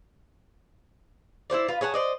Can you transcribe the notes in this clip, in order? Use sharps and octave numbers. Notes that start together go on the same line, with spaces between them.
E4 G4 C5 D5
F4 B4
G#4 C#5 F#5 A5
C5 D5 D#5